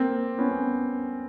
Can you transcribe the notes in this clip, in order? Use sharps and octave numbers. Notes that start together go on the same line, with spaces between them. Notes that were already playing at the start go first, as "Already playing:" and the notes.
Already playing: A#3 C4
B3 C#4